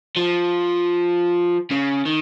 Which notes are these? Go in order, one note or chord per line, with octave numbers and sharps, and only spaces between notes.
F3
C#3
D#3